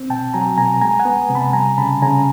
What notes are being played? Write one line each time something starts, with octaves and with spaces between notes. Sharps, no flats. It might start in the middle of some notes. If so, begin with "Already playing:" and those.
Already playing: C4
B2 G5 A5
F#3 G#5 A#5
B2 G#5 A#5
G#3 G#5 A#5
F#5 G#5
B3
C3
A5 B5
G3 G#5 A#5
C#3 A5 B5
C#3 G#5 A#5